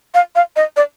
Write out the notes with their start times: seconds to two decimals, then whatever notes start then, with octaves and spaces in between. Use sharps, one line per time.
0.14 F5
0.36 F5
0.56 D#5
0.76 D5